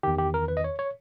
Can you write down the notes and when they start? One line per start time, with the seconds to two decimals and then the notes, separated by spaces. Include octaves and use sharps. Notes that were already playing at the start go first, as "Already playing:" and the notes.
0.03 E2 D#3 G4
0.18 G4
0.34 A#4
0.48 B4
0.57 D#5
0.64 C#5
0.79 C#5